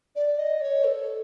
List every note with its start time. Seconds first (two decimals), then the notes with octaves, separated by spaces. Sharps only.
0.16 D5
0.39 D#5
0.61 C#5
0.84 A4